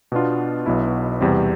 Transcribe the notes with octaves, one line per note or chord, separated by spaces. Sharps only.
B2 B3 D4 F4
B1 B2 B3 E4
E2 C3 G3 C4